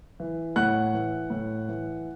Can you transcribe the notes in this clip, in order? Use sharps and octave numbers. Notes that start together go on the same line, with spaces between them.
E3
A2 F#5 F#6
E3
A2
E3